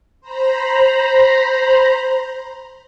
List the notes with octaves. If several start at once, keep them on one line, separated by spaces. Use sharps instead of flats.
C5 A#5 B5